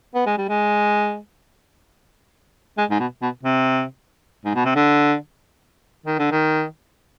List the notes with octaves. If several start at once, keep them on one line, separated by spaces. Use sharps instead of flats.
B3
G#3
G3
G#3
G#3
G#2
B2
B2
C3
G#2
B2
C3
D3
D#3
D3
D#3